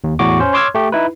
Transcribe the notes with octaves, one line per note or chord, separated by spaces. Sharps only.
D#2
E2 A2 F#4 D6
C#4 C5
C#5 C6 D6 E6 F6 G#6
A3 G4
D#4 E4 B4